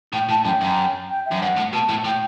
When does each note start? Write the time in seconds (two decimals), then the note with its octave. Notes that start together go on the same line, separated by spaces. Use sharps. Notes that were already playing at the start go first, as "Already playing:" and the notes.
0.13 A2 G5
0.29 A2 A5
0.45 F#2 G5
0.61 F#2
1.09 G5
1.26 E5
1.31 F#2
1.41 G2 F#5
1.56 A2
1.73 B2 A5
1.89 A2
2.05 A2 G5